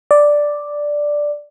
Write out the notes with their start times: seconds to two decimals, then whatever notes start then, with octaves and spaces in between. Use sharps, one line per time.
0.11 D5